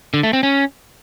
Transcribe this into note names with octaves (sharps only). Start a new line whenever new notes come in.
D3
A3
C4
C#4